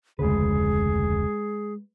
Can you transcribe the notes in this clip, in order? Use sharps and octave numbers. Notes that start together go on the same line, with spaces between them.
F1 D2 C#3 G#3 G#4 B4